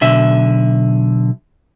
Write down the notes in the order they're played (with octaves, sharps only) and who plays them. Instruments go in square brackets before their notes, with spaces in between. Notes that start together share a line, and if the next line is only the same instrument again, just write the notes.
[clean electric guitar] B1 D3 E5